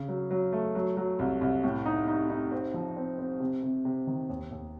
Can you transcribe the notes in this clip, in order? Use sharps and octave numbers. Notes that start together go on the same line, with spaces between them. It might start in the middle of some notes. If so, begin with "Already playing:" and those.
Already playing: C#3
F#3
F#3
A3
F#3
F#3
C2
C2
A2
D#4
D#4
D#4
C4
F3
C4
C4
C3
C3
C3
D#3
D#2
D#2